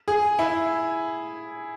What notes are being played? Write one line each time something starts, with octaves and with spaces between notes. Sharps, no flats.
G#4
E4